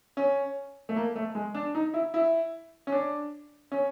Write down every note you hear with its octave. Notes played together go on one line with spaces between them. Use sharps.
C#4
A3
A#3
A3
G#3
D4
D#4
E4
E4
C#4
D4
C#4